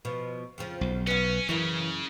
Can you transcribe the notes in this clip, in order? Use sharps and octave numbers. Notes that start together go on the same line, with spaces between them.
B2 F3
F2 C#3 F3
B1
B3 C#4 F5
F#2 C#3 E3 E4 A#4